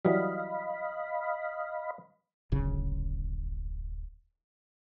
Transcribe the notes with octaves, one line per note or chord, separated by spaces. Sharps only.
E3 F#3 G3 D#5 F5 B5
D1 G#1 C#3